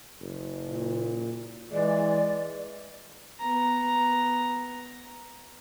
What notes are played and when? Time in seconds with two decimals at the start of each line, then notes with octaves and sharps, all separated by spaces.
0.20 F#1
0.65 A#2
1.72 E3 G#3 D5
3.40 B3 A#5